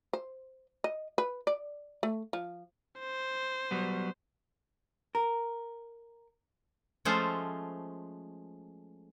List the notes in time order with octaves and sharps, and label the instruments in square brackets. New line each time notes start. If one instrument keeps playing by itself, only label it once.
[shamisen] C5
D#5
B4
D5
A3
F3
[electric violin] C5
[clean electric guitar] F#3 G3 B3
[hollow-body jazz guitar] A#4
[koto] F3 G#3 A3 C#4 F4 C5